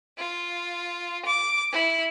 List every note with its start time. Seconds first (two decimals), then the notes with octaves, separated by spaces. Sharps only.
0.18 F4
1.25 D6
1.72 E4